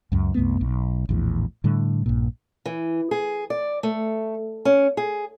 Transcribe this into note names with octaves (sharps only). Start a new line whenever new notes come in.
C#2 F#2
C2 F#2 A3 B3
B1
A#1 E2 A2
A2 D3 G3
A#1 G2 A#2
E3
G#4
D5
A3
C#4
G#4